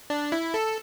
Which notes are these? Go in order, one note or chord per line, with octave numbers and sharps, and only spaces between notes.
D4
E4
A4